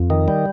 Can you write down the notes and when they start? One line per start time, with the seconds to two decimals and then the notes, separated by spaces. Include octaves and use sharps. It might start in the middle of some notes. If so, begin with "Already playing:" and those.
Already playing: F2
0.10 D#3
0.28 G3